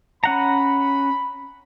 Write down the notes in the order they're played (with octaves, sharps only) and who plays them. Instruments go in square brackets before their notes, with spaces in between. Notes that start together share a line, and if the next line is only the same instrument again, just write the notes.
[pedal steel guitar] C#4 F#5 A#5 [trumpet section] B5